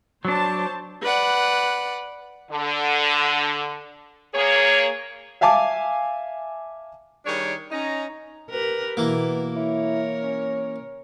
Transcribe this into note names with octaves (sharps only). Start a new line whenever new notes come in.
F#3 D4 C5 C#5 A5
B4 D5 F#5
D3
A#3 G#4 C#5
E5 F5 G#5 A5 D6
D#3 G3 D4 G#4 C#5
C#4 D#4 A#5
G4 A#4 B4
B2 E3 A#3 B3
E4 A#4 C#5
C#4